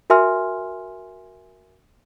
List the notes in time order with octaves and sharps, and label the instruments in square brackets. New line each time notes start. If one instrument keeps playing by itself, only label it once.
[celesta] F#4 A#4 E5 G#5 C6 F6